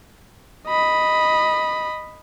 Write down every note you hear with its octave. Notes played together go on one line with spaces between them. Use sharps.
D#5 B5